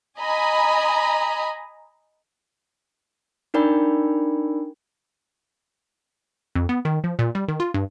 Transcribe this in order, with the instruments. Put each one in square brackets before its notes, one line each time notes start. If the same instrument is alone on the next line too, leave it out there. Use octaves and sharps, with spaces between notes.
[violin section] D#5 G#5 A#5 B5
[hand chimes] D4 D#4 A#4 D5 G5 B5
[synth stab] F2
B3
D#3
F3
A#2
G3
D#3
F4
G2